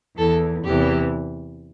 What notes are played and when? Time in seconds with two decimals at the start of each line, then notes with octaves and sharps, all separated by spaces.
0.17 E2 E3 A4
0.63 E2 C3 E3 G4